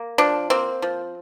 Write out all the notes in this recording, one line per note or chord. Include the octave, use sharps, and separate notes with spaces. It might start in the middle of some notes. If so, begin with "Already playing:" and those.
Already playing: A#3
F3 D4
A#3 C4
F3